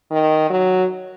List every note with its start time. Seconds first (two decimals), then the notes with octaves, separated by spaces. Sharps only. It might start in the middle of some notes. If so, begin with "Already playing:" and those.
0.11 D#3
0.50 F#3